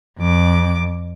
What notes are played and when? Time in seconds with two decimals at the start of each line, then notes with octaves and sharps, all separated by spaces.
0.20 F2 D6